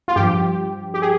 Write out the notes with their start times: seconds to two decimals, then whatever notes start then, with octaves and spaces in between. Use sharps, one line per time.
0.08 F4
0.16 G2 F3 G4
0.94 G4
1.02 G#4